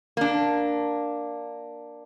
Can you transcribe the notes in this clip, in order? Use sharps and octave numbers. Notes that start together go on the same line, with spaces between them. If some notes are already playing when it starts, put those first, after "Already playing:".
A#3 D4